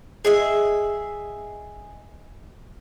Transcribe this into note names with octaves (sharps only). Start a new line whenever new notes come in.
G#4 D#5 E5